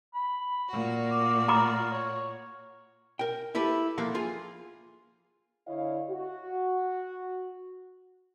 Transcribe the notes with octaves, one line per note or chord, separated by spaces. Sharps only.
B5
A#2 F#4
D6
F4 A#5 B5 D6
C#5
A#4 G5
E4 G4 A4 B4
F3 A#3 A4 F5 F#5
F4 G#4
D3 E4 C#5 D#5 F5
F#4